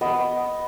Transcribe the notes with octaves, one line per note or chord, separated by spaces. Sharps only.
B3 D#5